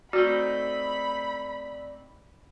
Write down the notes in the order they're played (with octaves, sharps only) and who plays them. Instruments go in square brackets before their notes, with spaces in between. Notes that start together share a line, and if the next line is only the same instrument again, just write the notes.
[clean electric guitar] A3 C4 D#4 [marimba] F#4 [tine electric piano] D5 [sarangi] B5